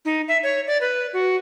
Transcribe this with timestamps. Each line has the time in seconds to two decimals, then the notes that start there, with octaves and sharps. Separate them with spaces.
0.05 D#4
0.28 E5
0.43 C#5
0.67 D5
0.81 B4
1.13 F#4